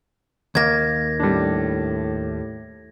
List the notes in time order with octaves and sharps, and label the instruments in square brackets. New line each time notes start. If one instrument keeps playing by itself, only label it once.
[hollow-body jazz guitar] D#2 A#3 [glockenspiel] G#6 A#6
[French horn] A2 [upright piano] G3 D4